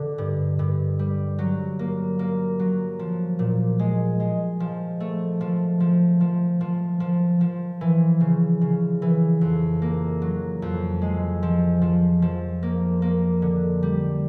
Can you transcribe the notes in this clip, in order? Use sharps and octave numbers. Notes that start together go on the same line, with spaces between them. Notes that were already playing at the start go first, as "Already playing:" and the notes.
Already playing: D3
G2
G2
G3
F#3
A#3
A#3
F#3
F3
A#2
G#3
G#3
F3
A3
F3
F3
F3
F3
F3
F3
E3
C#3
C#3
E3
F2
A#3
F#3
F2
G#3
F3
F3
F3
A#3
A#3
D3
G3